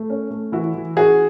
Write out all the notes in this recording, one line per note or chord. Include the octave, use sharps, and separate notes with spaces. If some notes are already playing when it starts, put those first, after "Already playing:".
Already playing: A3
C#4
A3
E3 E4 F#4
E3
C#4 F#4 G#4